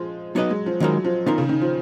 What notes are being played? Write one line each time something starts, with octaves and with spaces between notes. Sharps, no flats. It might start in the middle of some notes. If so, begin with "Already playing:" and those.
Already playing: F3 G#3
F#3 B3 D#4 F#4 B4 D#5
G#3
F3
D#3 F#3 G#3 D#4 A#4
F3
D#3 B3 F4 A#4
C#3
D#3
F3